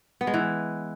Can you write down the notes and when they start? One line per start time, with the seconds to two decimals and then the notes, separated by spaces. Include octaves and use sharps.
0.21 B3
0.27 G#3
0.34 E3